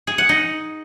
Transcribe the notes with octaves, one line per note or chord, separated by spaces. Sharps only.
G#4
F#5
D#4